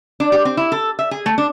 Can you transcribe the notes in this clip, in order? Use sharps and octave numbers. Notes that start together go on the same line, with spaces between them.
D4
G4
C4
E4
A4
E5
G#4
A3
D4